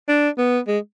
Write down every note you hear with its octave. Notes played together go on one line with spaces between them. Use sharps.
D4
B3
G#3